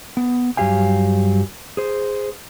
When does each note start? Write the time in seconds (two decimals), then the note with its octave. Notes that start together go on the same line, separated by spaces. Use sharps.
0.17 B3
0.57 G2 F#3 G4 F5 G#5
1.77 G#4 C5